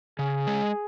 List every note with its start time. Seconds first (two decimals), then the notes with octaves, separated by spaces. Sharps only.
0.19 C#3 G#4
0.47 G#3